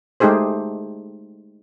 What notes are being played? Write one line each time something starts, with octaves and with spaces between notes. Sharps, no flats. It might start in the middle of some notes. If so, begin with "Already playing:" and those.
G#3 A3 D#4 G4 G#4 C5